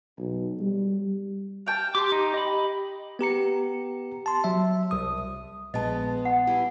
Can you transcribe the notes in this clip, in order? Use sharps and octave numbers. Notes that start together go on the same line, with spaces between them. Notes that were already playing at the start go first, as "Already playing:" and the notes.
B1
G3
F5 G5 A5
G4 C6 D6
D#4
D#5 B5
B3 G4 A#5 C#7
A5 C6
F#3 E5
C2 D#6
A#1 G#3 B3 D#5 A5
F#5
E4 G4 G#5